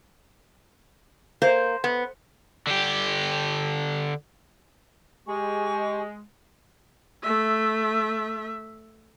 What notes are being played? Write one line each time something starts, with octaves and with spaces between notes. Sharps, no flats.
A#3 C5
B3
D3 G4
G#3 G4 G#5 C#6
A3 E5